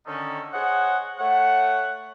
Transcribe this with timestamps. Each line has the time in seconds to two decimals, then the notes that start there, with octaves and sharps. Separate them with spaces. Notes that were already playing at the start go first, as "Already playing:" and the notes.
0.06 D3 D#3 C#4 A4
0.53 G#4 C5 C#5 D#5 F#5
1.18 A3 C#5 F#5